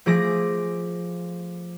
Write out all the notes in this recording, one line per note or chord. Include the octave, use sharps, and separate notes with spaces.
F3 A3 G#4 D6 A#6